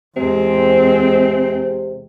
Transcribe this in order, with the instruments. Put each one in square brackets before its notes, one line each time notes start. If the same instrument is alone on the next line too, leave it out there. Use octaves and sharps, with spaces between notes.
[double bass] E2 G#3 [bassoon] C3 [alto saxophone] C4